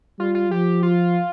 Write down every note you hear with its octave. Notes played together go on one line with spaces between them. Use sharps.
G3 F4
F4
F3 G4
F4